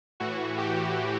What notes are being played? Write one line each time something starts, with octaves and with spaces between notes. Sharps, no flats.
A2 E3 F#4
G4